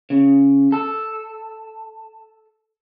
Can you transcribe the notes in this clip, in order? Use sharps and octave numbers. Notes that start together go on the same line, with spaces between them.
C#3
A4